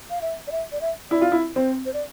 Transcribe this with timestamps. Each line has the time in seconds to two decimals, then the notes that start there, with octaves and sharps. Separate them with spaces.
0.10 F5
0.22 E5
0.47 D5
0.52 E5
0.72 D5
0.81 E5
1.11 E4 D5
1.21 F4
1.32 E4
1.56 C4 C5
1.85 C5
1.94 D5